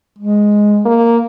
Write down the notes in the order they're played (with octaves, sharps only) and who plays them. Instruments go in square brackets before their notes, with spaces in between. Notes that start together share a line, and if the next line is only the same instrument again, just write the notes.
[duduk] G#3
[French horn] A#3